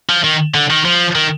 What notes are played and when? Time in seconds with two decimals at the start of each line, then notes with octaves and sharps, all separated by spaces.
0.10 F3
0.24 D#3
0.54 D3
0.70 D#3
0.85 F3
1.16 D#3